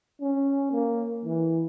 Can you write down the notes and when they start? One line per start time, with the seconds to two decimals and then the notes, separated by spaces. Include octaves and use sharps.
0.21 C#4
0.72 A#3
1.25 E3